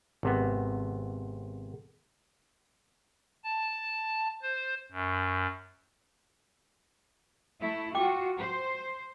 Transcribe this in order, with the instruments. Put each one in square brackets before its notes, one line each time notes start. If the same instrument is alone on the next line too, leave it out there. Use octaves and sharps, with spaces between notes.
[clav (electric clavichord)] G#1 C3 B3
[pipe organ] A5
C5
F#2
[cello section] A3 E4
[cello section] F4 F#4 [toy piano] G5 D6
[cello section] C5